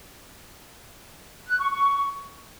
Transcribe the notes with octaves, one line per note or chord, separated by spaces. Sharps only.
F#6
C#6
C#6